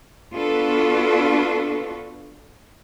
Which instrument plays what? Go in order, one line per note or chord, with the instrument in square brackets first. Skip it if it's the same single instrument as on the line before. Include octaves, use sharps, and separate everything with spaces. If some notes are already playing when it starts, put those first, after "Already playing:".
[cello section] B3 D4 F4 F#4 A4 B4